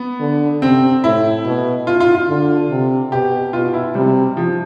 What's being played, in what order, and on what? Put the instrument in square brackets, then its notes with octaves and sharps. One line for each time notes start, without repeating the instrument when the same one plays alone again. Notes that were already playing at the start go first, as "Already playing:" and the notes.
Already playing: [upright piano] B3
[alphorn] D3
[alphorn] C3 [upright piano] C4
[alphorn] A2 [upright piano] E4
[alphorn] B2
[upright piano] F4
F4
F4
[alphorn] D3
C3
[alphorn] B2 [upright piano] G4
[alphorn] B2 [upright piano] F4
[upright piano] E4
[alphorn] C3 [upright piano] G3
[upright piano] F3